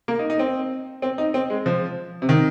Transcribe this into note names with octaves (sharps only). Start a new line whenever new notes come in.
A#3
D#4
D#4
C4
C4
D#4
C4
G#3
F3
C3
D#3